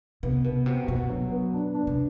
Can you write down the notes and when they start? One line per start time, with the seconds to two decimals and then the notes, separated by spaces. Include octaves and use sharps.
0.23 C3 B3
0.44 B2 B3
0.66 C3 F#4
0.87 B2 F#4
1.09 F#3
1.31 B3
1.53 D4
1.74 D4
1.87 C3